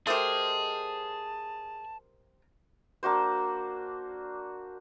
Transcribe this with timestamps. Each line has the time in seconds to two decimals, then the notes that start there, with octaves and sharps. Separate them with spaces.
0.07 A3 G4 G#4 A#4 C5 D#5 A5
3.03 A#3 D4 F#4 C5